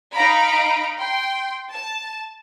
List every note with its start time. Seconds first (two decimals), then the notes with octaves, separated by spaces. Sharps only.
0.14 D#4 D#5 F5 A#5 B5 D7
0.99 G5 C6
1.72 A5